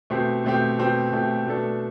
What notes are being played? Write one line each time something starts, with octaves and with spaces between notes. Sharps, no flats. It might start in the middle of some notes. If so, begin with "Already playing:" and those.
B2 A3 C4 G4
B2 A3 C4 G4
B2 A3 C4 G4
B2 A3 C4 G4
B2 A3 D4 A4